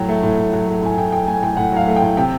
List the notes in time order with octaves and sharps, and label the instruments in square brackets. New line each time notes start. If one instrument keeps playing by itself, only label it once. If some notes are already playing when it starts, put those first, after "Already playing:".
Already playing: [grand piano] A2 F#3 G5
A3
A2
A2
F#3
A3
A2 G#5
A2 G5
F#3 G5
A3 G#5
A2 G5
A2 F#5
F#3 F5
A3
G5
A2
C3 G5